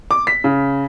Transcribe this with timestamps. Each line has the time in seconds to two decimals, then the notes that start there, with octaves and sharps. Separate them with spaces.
0.11 D6
0.27 B6
0.44 C#3